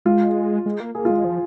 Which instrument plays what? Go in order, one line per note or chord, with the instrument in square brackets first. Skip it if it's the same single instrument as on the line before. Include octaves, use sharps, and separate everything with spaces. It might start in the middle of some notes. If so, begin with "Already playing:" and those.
[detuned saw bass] G#3 [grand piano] F4
[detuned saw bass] G#3
A#3
[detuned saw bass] A#3 [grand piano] G#4
[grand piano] F4
[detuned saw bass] G#3
F3